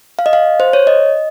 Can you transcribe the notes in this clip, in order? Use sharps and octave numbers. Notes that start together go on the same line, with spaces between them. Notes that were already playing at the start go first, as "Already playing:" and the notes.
F5
D#5
F5
C5
C#5
D#5